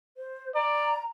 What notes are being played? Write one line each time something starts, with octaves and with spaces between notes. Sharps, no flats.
C5
D5 A#5